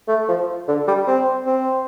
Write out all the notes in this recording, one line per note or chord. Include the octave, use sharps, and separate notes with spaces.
A3
F3
D3
G3
C4
C4